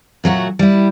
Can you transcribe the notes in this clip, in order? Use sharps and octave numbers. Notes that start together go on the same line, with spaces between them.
A#2 F#3 A3 F#4
G3 E4